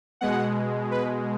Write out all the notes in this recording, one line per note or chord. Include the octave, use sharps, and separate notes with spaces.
B2 G#3 F#5
B4